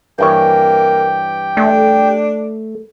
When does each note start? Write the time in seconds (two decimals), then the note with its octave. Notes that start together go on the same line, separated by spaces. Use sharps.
0.19 G2 E3 A#3 G4 C#5 G5
1.57 A3 D4